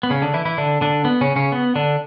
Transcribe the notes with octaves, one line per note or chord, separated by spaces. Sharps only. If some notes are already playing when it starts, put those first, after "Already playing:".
B3
C#3 C#4
D3 D4
E3 E4
E3 E4
D3 D4
D3 D4
B3
C#3 C#4
C#3 C#4
B3
D3 D4